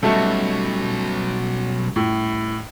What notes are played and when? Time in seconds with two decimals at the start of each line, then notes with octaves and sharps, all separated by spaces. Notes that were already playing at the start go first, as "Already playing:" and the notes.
0.03 B2 F#3 G3 A3 C#4 D#4 F#4 A4
1.96 A2